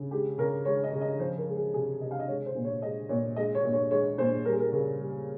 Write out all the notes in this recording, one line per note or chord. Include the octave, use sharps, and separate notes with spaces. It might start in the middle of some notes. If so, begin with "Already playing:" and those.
Already playing: C#3
G#3 G4
C#3 A#4
G#3 C#5
D#5
C#3
D#5
F3 C5
A#4
G#3
G#4
C3 G#4
C3 D#5
F5
D#5
G#3 C#5
C5
A#2
C#5
G#3 D#5
A#2 C#5
G#3 D#5
C#5
A#2
C#5
G#3 C#5
A#2 C5
G3 A#4
G#4
A#4
C#3 A#4
G3